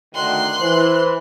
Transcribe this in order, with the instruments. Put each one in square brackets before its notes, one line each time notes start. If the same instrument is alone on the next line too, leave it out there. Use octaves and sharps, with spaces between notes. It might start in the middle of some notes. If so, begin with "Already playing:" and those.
[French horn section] D2 D3 D#3 [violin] C6 F#6
[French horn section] E3 [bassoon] C5